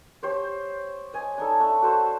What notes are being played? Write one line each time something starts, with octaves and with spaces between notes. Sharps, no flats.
G4 C5 C#5
D#5 G#5
D4 D#4 A4
A3 D4
F#4 A4 C5